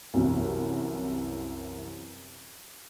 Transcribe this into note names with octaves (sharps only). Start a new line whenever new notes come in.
C2 F#2 C3 E3